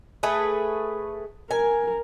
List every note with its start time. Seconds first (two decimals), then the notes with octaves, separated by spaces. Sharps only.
0.23 A3 G#4 B4
1.51 A#4 G#5